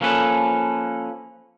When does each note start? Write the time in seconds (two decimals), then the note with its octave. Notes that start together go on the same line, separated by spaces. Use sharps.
0.01 F3 A#3 C#4 A4 B4